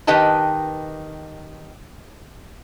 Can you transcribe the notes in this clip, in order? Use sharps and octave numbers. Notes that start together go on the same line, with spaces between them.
D#3 G4 B4 D#5 G5 A5